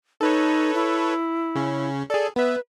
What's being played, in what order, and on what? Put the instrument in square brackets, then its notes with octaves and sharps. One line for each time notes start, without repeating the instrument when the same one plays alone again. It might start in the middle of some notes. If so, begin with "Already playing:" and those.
[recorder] D#4 [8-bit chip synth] A4 B4 C#5
[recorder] E4
[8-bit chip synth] C#3 C#4
[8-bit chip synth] G#4 A4 [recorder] D5
[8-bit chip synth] B3 E5 [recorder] B4